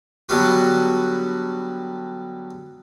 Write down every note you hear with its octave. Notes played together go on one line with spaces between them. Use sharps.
D3 F#3 G3 B3 F#4